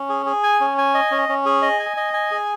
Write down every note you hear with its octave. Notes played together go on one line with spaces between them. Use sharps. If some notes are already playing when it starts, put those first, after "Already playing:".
Already playing: C#4
G#4
G#4
G#5
C#4
G#5
D#5
C#4
C#4
G#4
D#5
G#5
D#5
G#5
G#4